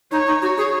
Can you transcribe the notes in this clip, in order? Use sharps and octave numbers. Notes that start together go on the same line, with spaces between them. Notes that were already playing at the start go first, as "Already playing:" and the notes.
D#4 C#5
D#4
F#4 C#5
G#4